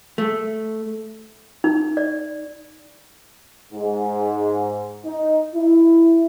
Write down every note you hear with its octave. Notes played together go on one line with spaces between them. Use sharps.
A3
D#4
D5
G#2
D#4
E4